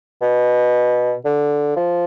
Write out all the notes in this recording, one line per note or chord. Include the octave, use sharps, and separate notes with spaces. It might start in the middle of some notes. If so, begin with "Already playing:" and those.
B2
D3
F3